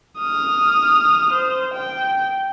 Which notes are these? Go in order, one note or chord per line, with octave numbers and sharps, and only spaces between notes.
D#6 F6
C5
G5